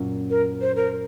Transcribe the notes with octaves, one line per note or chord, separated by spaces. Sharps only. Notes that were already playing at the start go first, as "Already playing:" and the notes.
Already playing: F#2 A#2
A#4
C5
A#4